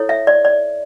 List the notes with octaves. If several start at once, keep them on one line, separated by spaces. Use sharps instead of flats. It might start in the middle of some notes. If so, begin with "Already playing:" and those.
Already playing: E4 A4 C#5
E5
D5
D5